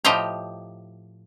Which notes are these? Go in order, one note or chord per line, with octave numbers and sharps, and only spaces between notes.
A2 F3 G4 D#5 G5 A#5